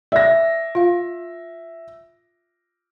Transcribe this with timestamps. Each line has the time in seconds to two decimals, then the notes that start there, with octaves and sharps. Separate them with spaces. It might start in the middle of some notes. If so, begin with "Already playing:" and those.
0.12 D5 E5 A#6
0.75 F4 F5